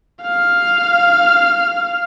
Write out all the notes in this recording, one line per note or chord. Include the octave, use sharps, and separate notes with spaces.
F5 F6